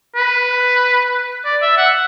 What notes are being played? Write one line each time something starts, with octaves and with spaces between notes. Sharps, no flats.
B4
D5
E5
F#5